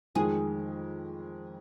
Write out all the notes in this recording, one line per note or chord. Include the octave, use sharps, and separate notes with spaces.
F2 D#3 G#3 G#4